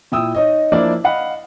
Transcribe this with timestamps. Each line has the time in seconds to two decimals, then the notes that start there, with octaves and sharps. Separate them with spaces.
0.12 A#2 E4 G5 D#6 E6
0.35 D#4 C#5 D#5
0.72 F3 A#3 D4 E4 D5
1.04 D#5 F5 F#5 B5